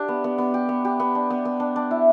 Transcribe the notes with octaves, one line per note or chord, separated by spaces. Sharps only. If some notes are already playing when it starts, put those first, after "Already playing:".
Already playing: D4 G4
B3
B3
B3
G4
B3
G4
B3
D4
B3
B3
D4
D4
E4